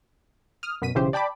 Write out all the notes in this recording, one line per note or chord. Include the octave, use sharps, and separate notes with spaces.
D#6 F6
F#2 B2 B6 D#7
B1 C#3 E3 G4 C5
D5 G5 A5 B5 D6